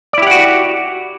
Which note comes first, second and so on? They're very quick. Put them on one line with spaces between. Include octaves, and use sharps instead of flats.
D5 E4 G4 F#5 F#4